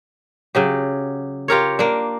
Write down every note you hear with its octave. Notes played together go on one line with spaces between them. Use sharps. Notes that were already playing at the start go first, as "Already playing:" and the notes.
C#3 F#3 G4
F4 G4 A#4 C#5
A#3 D4